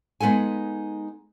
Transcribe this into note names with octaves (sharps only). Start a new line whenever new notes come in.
G#3 B3 D#4 A4 G#5